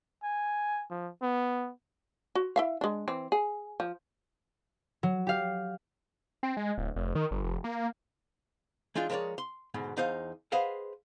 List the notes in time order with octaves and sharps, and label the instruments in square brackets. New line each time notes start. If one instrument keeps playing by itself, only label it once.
[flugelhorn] G#5
F3
B3
[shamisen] F#4
E4 E5 F5
G#3 D4
E3 C4
G#4
F3
[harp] F#3
G4 F5
[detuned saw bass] C4
G#3
D1
F1
D#3
G1
F1
A#3
[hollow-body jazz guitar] E3 G#3 D4 D#4 F4
F3 G#3 A#4 C#5 D5
C6
D2 G#2 B2
E2 D#4 C5 F5
G#4 B4 C5 D#5 F5 F#5